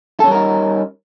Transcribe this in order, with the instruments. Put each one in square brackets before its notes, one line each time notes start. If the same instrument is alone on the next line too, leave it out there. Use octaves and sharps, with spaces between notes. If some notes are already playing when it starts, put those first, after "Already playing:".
[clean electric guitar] A4
C#4
G3
A#4
D#4